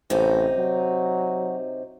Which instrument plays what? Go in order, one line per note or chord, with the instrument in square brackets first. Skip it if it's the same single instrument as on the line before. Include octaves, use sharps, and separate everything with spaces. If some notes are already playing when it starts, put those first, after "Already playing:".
[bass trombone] A1 [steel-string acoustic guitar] C3 D#4
[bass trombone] F#3